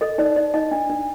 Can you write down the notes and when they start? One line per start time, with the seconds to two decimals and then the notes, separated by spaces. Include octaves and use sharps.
0.01 A4 D#5
0.18 D#4 D5
0.36 D#4 D5
0.54 D#4 D#5
0.71 D4
0.90 D4